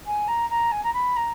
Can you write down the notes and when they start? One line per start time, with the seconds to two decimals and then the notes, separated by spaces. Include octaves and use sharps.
0.06 G#5
0.28 A#5
0.50 A#5
0.72 G#5
0.83 A#5
0.93 B5
1.16 A#5